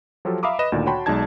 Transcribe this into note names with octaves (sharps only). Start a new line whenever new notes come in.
F3 F#3 F4 G4 A4
E5 F5 A#5 B5 D6 D#6
B4 D#5 B5 E7
D2 A#2 D#3 D5
F#4 C#5 G5 A5 B5 C6
B1 G#3 D#4 D5 A5 G#6